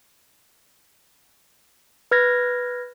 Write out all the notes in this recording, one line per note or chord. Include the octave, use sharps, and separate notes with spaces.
B4 F6 G#6 A#6